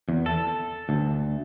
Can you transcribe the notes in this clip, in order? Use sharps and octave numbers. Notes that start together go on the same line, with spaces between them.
E2
A4
D2